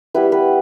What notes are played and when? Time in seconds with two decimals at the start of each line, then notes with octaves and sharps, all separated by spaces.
0.14 G3 B3 E4 B4
0.32 B4